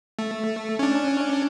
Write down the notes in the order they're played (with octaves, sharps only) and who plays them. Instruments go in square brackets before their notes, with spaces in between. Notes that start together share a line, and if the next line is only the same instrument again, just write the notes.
[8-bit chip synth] A3
C#4 D4